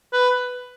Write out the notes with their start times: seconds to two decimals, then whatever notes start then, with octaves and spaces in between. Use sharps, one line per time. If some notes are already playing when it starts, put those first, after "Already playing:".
0.13 B4